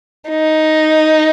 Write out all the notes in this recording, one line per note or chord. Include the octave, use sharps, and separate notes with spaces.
D#4